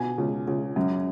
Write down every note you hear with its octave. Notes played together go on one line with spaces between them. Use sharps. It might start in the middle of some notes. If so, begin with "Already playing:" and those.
Already playing: B2 G#5
C#2
C#2
F#2